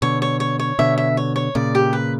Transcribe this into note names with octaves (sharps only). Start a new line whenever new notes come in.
B2 D3 C#5
C#5
C#5
C#5
B2 D3 E5
E5
C#5
C#5
A#2 C#3 D5
G4
B4